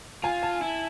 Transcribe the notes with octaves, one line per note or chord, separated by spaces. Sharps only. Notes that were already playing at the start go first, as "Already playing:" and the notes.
F4 G#5
A5
E4